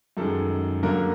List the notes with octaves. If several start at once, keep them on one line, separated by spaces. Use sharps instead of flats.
F#2 D#3 G#3 A4
F#2 D3 F#3 A#3 A#4